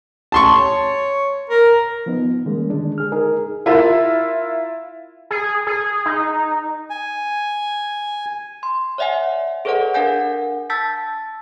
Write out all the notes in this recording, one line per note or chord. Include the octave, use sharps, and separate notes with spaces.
A5 C6 C#6
C#5
A#4
F3 B3 D#4
D#3 G3 G#3 A#3 C#4
D3 G#3 D4
G#4 F6
D#4 G#4 A#4
E4 F4 A#4 E5
G#4
G#4
D#4
G#5
C6
C#5 D5 E5 F#5 G#5
G#4 A4 B4 C#5 D#5 F#5
D4 A#4 F5 F#5 G#5 G6
A5 E6 G6 A6 B6